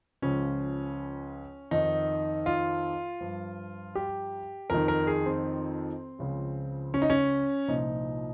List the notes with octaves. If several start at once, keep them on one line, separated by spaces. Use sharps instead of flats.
C#2 C#3 F3 C#4
F2 D#3 D#4
F4
G2 F3
G4
F2 D#3 A#4
A#4
G#4
C4
C#2 C#3 F3
C#4
D#4
C#4
C2 A#2 F3 D#4